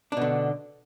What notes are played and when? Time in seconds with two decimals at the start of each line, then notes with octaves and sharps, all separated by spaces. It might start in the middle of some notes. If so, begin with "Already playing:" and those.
0.12 D4
0.17 B2
0.21 D3